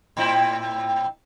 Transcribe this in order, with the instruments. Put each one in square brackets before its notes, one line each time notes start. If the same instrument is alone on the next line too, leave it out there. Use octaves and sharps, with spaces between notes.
[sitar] A2 C4 E4